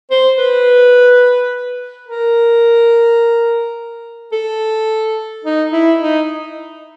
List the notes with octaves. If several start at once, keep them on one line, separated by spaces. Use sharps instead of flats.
C5
B4
A#4
A4
D#4
E4
D#4